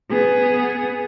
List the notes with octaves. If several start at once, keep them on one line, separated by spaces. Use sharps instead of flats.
B3 G#4